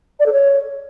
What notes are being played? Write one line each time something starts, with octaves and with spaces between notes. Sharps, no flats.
D5
A4
C#5